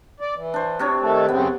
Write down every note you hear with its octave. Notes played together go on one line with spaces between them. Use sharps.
D5
E3
D4 C5
C3 D4 C#5
D#3 A3 A4
F#2 C#3 B3 C4